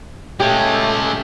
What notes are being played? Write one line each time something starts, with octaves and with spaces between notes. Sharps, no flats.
A#2 G#3 A3 C#4 G4